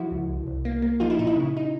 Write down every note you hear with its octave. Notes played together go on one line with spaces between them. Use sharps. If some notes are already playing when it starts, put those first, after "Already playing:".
Already playing: F3 E4 F#4
C#2
C2
C2
A#3
A#3
F3 D#4 F4
E4
A#2 D#4
E4
C#3
D#4